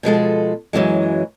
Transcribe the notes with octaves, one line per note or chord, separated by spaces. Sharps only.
B2 F3 G#3 A4
F#2 E3 F#3 G#3